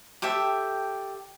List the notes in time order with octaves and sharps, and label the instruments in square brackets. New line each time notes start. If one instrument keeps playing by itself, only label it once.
[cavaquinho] G4 A4 E5 G5